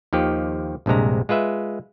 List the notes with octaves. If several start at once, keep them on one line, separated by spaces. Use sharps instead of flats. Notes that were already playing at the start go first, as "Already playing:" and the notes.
D#2 D#3 F3 G4
A#1 G2 C3 G#3 A#5
G#3 F4 B4 E5